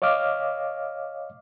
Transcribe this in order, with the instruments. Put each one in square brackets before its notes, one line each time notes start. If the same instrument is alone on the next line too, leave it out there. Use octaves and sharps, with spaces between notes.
[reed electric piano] C#5 D#5 F5 D6 F6